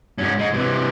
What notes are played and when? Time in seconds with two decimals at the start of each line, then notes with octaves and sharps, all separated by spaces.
0.18 G#2 C#4
0.39 G#3 D#4
0.53 C3 E3